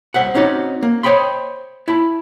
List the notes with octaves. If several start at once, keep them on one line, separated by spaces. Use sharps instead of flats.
C2 F#2 C5 E5 F#5
C4 C#4 D#4 F#4 D5
A#3
C5 C#5 D#5 G5 B5 C6
E4 A5 B5